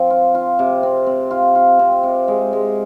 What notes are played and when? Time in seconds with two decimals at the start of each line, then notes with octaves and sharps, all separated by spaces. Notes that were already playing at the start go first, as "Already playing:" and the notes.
Already playing: F3 C4
0.10 F4
0.35 F4
0.59 C3
0.83 C4
1.07 C4
1.31 F4
1.55 F4
1.79 C4
2.03 C3
2.28 G#3
2.53 G#3